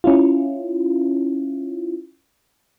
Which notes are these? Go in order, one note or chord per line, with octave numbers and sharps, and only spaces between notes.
C#4 E4 F4